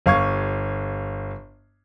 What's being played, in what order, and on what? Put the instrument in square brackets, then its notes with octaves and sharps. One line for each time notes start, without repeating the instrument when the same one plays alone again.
[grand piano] G1 F5 C#6 G#6